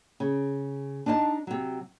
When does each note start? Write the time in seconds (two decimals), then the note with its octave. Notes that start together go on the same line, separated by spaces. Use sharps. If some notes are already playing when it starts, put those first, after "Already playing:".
0.20 C#3
1.06 D4 D#4 D#5 G5 A5
1.47 C3 F#3